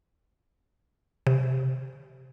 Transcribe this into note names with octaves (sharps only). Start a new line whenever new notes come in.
C3